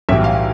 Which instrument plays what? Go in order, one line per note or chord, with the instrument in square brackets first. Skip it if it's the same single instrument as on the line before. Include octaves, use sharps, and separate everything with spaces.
[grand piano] B1 A2 E3 G3 E5
F5